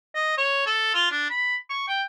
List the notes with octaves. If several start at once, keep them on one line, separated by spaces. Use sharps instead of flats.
D#5
C#5
A4
F4
D4
B5
C#6
G5